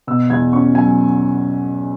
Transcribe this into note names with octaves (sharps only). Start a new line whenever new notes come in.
B2 E6
E2 G#6
C#4 C#6
F#3 G#5